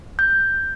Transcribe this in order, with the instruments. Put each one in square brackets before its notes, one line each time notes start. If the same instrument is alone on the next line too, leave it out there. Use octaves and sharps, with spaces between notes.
[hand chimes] G6